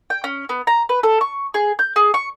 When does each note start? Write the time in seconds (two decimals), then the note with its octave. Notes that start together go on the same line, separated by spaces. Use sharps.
0.10 G5
0.24 C#4
0.49 B3
0.67 A#5
0.89 B4
1.03 A4
1.21 C#6
1.54 G#4
1.79 G6
1.96 G#4
2.14 C#6